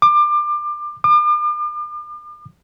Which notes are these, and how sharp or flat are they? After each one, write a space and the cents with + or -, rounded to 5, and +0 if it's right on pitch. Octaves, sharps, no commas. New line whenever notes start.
D6 +25
D6 +40